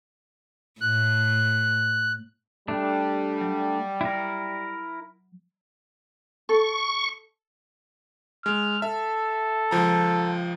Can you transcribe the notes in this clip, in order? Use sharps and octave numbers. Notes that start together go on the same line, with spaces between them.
A2 A3 F#6
G3 A3 D4
F#3
E4 A#4
A4 C#6
G#3 F6
A4 E5
C#2 F3 A#5